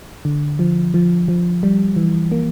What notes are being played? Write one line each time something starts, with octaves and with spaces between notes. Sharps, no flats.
D3
F3
F3
F3
G3
E3
A#3